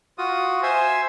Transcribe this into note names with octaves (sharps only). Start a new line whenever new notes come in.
F4 F#4 D#6
C5 E5 G#5